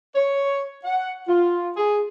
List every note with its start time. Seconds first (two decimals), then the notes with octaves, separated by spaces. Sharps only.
0.15 C#5
0.84 F#5
1.28 F4
1.77 G#4